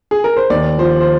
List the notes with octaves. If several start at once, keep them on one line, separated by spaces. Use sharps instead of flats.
G#4
A#4
C5
D#2 D5
F3 C5
C5